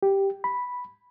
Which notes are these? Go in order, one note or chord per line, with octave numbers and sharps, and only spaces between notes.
G4
B5